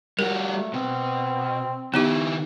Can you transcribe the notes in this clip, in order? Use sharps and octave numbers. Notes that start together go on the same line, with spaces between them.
G3 F#4 A#4
A3
B2 C4
D#3 B3 D#4 E4 G4